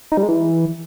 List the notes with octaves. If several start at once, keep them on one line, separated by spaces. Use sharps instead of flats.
D#4
G3
G#3
E3